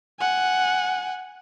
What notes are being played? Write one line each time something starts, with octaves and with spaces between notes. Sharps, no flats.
F#5 G#5